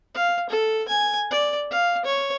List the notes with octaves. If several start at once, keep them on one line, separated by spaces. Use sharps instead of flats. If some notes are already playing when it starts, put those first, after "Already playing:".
F5
A4
G#5
D5
F5
C#5